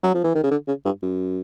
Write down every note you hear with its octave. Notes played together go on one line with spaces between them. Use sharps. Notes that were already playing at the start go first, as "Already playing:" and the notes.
F#3
F3
E3
D#3
C#3
D3
C#3
G2
F#2